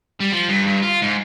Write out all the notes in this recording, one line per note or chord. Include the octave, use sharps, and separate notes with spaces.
G3
F3
G2
G2
F4
G#2